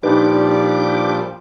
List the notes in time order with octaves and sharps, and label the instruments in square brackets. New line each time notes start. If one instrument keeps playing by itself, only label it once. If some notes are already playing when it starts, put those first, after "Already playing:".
[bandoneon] A#2 F3 G3 [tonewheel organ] D4 G4 D6 [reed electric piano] D#4 B4